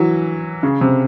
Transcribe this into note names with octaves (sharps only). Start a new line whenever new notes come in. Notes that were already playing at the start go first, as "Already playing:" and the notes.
Already playing: E3 F#3
C#3
C3